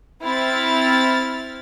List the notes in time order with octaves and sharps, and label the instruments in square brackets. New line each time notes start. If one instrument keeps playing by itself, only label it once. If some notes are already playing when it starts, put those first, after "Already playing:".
[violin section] C4 E4 B5 F6 A6